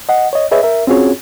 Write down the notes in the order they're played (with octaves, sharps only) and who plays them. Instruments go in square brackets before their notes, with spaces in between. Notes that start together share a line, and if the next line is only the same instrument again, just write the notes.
[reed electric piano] D#5 F#5
C#5 D#5
G#4 B4 C#5 D#5 E5
A#4 E5
C4 C#4 F4 F#4 G#4 C#5